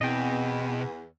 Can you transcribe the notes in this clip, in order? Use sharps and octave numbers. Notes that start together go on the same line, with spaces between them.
E2 B2 C4 D#5 G5